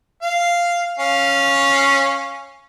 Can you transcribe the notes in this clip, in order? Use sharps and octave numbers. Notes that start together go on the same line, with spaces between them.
F5
C#4 F5